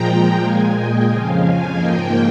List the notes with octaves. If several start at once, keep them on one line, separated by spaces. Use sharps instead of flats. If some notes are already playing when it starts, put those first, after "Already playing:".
Already playing: A#2 F3 G#3 G5 A#5
A#2 G#3 F5 G#5
D#5 G5
F2 C#3 F3 F5 G#5
F5 G#5
G#2 F3 A#3 D#5 G5